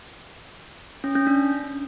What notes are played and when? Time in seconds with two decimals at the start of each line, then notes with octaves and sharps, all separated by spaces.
1.04 C#4
1.15 C#4
1.27 D4